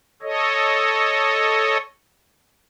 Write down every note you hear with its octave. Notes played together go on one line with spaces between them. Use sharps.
A4 C#5 D#5